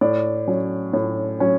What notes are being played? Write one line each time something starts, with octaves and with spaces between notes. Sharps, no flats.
A2 D5
F#3 C#4
A2
F#3 C#4